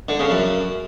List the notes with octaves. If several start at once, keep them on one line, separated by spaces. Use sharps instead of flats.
D3
C#3
F#2